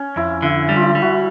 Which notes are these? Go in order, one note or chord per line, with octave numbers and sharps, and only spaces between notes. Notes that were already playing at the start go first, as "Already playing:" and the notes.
Already playing: C#4
F2 E4
D3 E4
G3
F4
E4
G3
F#4